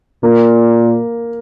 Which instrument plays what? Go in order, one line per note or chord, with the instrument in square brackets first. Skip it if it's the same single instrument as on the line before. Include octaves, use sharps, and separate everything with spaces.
[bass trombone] A#2 [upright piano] A#3